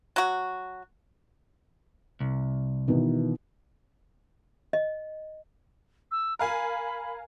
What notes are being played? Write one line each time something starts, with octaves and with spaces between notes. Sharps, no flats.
F#3 F#4
C2
B2 D#3 E3
D#5
E6
A#4 F5 G#5 B5